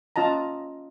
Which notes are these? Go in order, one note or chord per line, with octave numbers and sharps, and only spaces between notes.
C#4 F4 D#5 A5 A#5